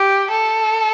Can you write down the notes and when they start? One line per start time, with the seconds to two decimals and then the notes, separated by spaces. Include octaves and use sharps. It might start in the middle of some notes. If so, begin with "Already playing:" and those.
Already playing: G4
0.30 A4